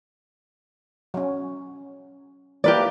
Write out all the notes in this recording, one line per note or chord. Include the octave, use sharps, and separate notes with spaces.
F#3 C#4
E3 A#3 G4 A#4 B4 D5